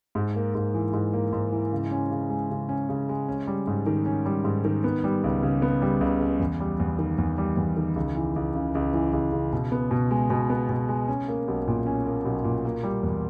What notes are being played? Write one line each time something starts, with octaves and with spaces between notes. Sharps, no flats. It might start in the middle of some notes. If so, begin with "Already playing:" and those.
G#2
A#3
G#2
E3
G#2
A#3
G#2
E3
C#3
C#4
C#3
G#3
C#3
C#4
C#3
G#3
C#4
G3
G#2
D#3
C#4
G3
G#2
D#3
B3
G3
C#2
C#3
B3
G3
C#2
C#3
E2
G3
E2
D#3
E2
G3
E2
D#3
C#2
E3
C#2
C#3
C#2
E3
C#2
C#3
B2
B3
B2
G#3
B2
B3
B2
G#3
C#4
A#3
B1
A#2
C#4
A#3
B1
A#2
A#3
G3
E2